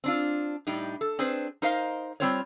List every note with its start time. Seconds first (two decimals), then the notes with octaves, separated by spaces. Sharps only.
0.04 C4 D4 F4
0.67 A2 G3 D4 D#4
1.01 A4
1.19 C4 D4 G#4 B4 C5
1.62 D#4 A#4 C5 D#5 F5
2.20 G3 G#3 C4 F4 C5 C#5